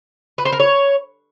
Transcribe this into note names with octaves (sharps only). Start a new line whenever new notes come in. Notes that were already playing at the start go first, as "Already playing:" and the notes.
B4
C5
A#4
C#5